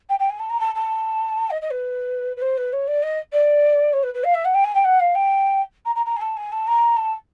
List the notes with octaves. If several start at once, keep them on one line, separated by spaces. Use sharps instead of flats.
G5
G5
G#5
A5
A#5
A5
A5
D#5
D#5
B4
B4
C5
B4
C#5
D5
D#5
D5
C#5
B4
B4
F5
E5
F#5
G5
G#5
G5
F#5
F5
G5
A#5
A#5
A#5
G#5
A5
G#5
A5
A#5
A5